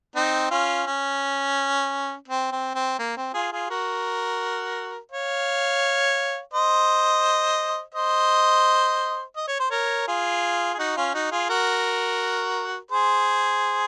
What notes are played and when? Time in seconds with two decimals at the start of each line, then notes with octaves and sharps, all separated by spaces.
0.15 C4 D#4
0.51 C#4 F4
0.86 C#4
2.28 C4
2.51 C4
2.75 C4
2.99 A#3
3.17 C4
3.34 F4 G#4
3.52 F4 G#4
3.70 F#4 A#4
5.11 C#5 F5
6.53 C5 D#5
7.95 C5 D#5
9.37 D#5
9.48 C#5
9.60 C5
9.71 A#4 C#5
10.08 F4 G#4
10.74 G#4
10.79 D#4 F#4
10.96 C#4 F4
11.14 D#4 F#4
11.31 F4 G#4
11.49 F#4 A#4
12.91 G#4 C5